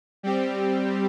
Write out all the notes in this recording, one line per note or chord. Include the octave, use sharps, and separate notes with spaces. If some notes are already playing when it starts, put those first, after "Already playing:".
G3 C4 G4